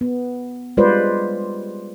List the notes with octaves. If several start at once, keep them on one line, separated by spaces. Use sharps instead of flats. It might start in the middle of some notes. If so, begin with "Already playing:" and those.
B3
G3 G#3 F4 B4 C5 D5